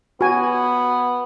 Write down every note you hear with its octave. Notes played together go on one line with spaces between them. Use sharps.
B3 F#4 G#5